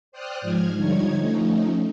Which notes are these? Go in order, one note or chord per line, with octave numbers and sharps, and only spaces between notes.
C5 D5 G5 D#6 F6 F#6
G#2 F3 G#3 F6 G#6
D3 F3 G3 D#4 C#5 G#6
F3 A3 C#4 D#4